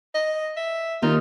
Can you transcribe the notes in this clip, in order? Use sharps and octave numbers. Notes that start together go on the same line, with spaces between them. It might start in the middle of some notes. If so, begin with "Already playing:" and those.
D#5
E5
D#2 D#3 D#4 F4